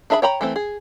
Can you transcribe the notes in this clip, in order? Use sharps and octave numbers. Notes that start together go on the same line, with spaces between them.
D4 G#4 E5 A#5 B5
C#5 G5 A#5 B5
E3 A3 C4
G#4